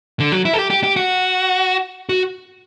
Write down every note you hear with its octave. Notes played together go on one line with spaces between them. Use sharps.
D3
F#3
E4
A4
G4
G4
G4
F#4
F#4